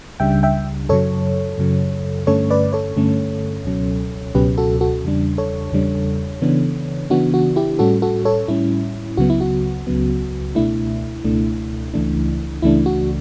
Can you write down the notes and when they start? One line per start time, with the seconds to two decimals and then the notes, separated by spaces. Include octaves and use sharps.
0.20 C#2 C#3 G3 D4 E5 G5
0.43 E5 G5
0.89 F#2 C#3 F#3 A4 C#5
1.58 F#2 C#3 F#3
2.27 G2 D3 A3 C#4 A4 C#5
2.50 B4 D5
2.73 A4 C#5
2.96 G2 D3 A3 C#4
3.65 C#2 B2 F#3 C#4
4.34 C#2 B2 F#3 C#4 G4 B4
4.58 F#4 A4
4.81 F#4 A4
5.04 E2 C#3 G3 D4
5.38 A4 C#5
5.72 E2 C#3 G3 D4
6.42 C#3 E3 B3 D4
7.10 C#3 E3 B3 D4 F#4
7.34 F#4
7.56 E4 G4
7.79 A2 G3 C#4 F#4 A4
8.02 F#4 A4
8.25 A4 C#5
8.48 A2 G3 C#4 E4
9.17 C#2 C#3 F#3 B3 F#4
9.30 E4
9.41 F#4
9.87 C#2 C#3 F#3 B3
10.55 C#2 B2 A3 D4 E4
11.24 C#2 B2 A3 D4
11.94 C#2 C#3 E3 A3 D4
12.62 C#2 C#3 E3 A3 D4 E4
12.86 F#4